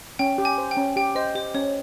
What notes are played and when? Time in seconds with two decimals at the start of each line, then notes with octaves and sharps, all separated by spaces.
0.19 C#4 G5
0.38 G4
0.45 G#5
0.58 C5
0.71 G5
0.77 C#4
0.96 G4 G5
1.15 C5 D#5
1.35 G4 C5
1.54 C#4 C#5